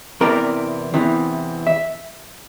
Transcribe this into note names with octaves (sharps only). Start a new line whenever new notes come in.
E2 C3 E3 A#4 D5
E2 C3 E3
E5